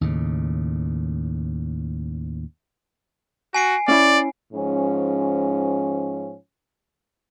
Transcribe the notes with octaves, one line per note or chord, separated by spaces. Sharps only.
D#2 A2 C#3
F#4 G#5 C7 D7
C#4 E4 D5
G#2 F3 C#4